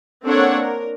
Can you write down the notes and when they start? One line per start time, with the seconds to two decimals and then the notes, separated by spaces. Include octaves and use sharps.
0.23 A#3 C4 D4 A4 C#5 F#5
0.61 A#4